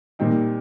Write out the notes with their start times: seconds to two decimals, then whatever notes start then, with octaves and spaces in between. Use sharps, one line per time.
0.19 A#2 G3 C4 D#4